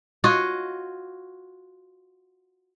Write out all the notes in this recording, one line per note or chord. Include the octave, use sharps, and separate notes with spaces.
F4 F#4 C#5 D#5